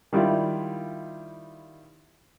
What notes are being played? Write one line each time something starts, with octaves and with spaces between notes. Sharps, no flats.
D#3 G3 E4 F4